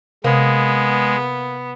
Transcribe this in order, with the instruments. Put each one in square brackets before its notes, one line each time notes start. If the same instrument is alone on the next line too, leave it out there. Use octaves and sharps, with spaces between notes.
[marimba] C3 [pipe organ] G#3 [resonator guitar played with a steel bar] A#3 [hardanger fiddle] B3